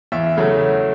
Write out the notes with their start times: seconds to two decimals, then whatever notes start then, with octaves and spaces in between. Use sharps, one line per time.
0.12 E2 E5
0.37 C#3 F#3 A3